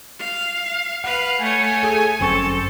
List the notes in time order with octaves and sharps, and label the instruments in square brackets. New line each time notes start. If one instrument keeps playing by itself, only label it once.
[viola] F5
[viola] B4 F5 [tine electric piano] F#5
[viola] A3 C#5 [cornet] G#5
[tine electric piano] G#4 A4
[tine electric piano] G1 F#2 C#6 [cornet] C4 [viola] A4